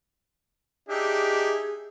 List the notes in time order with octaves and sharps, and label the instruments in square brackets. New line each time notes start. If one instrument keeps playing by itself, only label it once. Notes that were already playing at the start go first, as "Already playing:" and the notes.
[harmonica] D4 D#4 E5 [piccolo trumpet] G4 [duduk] G#4